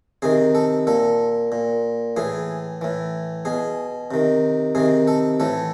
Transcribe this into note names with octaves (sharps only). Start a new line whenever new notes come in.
C3 D#3 G#4
A4
A#2 A4
A#2
A2 E3 G#4
A2 E3
B2 G#4
C3 D#3
C3 D#3 G#4
A4
A2 E3 A4